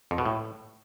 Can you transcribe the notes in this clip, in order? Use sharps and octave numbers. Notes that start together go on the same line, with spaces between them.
F2
B2
A2